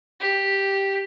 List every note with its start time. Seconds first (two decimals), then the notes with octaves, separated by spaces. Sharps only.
0.20 G4